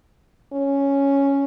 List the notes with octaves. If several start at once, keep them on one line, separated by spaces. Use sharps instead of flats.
C#4